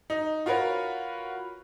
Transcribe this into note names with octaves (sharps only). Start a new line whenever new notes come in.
D#4
F4 F#4 A#4 B4 C#5 A#5